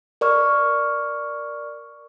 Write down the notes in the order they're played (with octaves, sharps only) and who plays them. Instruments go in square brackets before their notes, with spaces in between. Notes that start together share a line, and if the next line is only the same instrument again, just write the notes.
[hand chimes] A#4 D5 C#6 F6